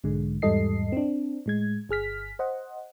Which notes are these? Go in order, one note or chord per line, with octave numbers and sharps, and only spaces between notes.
B1 G#2 D3 G#3
E2 G#2 G3 A4 D#5 C7
C4 D4
A2 G#3 G#6
G1 G#4 F6 B6
C5 D#5 F#5